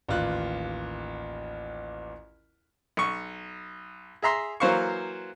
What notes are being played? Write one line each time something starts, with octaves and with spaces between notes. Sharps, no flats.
A1 D#2 F4 F#6
B1 C#6
G#4 E5 A#5 C6
E3 F#3 A#3 C5 F5 C#6